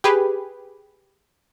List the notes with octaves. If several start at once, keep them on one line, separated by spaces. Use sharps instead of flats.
G4 G#4 B4